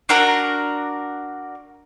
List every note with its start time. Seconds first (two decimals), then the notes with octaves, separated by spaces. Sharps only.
0.09 D4 F#4 A#4 D5